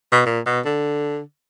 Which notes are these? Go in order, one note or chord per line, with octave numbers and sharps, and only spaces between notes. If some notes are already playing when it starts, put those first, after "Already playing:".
B2
A#2
B2
D3